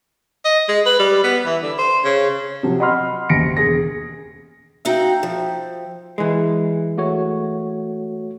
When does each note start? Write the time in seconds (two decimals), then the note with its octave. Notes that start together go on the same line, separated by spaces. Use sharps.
0.45 D#5
0.68 G#3
0.86 B4
0.99 G3
1.24 B3
1.45 E3
1.63 D3
1.78 C5
2.04 C#3
2.63 C3 F3 F#3
2.80 D#5 F#5 B5 C6 F6
3.29 F#1 D#2 A#6 C#7 D7
3.57 E1 G#4 A#6
4.85 D#4 F#4 E5 F5 G5
5.23 F3
6.18 E3 G#3
6.98 A3 F#4 C#5